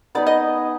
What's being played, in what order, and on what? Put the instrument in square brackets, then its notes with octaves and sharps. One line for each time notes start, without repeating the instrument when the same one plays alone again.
[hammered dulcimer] B3 D#4 G#4 B4 [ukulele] D5
[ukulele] D#5